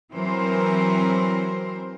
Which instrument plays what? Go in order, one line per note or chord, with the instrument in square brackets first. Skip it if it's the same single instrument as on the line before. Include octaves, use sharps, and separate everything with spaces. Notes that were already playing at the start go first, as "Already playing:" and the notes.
[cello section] E3 F#3 C4 A#4 C5